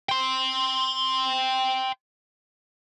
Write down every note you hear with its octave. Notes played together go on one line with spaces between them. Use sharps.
G5 C6